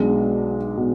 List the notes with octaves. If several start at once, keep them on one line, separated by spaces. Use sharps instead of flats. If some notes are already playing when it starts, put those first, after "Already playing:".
Already playing: B1 B2 G#3 D4
B2 G#3